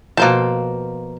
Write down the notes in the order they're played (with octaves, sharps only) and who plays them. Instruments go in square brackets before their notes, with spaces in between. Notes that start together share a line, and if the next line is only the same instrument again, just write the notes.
[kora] B2 F3 [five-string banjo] A#3 C5 A5